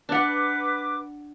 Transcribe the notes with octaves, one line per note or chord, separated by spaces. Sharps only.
D4 B4 F#5 D6